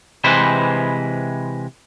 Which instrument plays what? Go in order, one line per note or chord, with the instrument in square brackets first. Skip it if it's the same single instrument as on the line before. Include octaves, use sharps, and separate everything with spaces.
[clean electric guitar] C3 E3 G#3 B4 C5